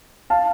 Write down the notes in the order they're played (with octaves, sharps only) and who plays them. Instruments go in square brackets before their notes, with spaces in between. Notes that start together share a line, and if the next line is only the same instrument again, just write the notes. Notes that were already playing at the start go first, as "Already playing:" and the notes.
[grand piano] F5 A5